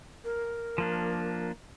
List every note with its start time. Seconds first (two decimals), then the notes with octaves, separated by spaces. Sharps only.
0.25 A#4
0.78 F3 A#3 D4